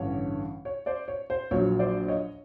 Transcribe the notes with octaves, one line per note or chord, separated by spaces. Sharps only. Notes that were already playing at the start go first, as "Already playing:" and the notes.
Already playing: A1 G2 D3 C#5
C#5
C5 D5
C#5
C5
A#1 A#2 F#3 C#5
C5 D5
C#5 D#5